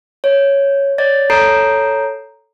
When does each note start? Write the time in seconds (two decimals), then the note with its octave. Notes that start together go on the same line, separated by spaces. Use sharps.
0.24 C#5
0.98 C#5 D5 A6
1.30 A4 C#5 A#5 G6 C7 D7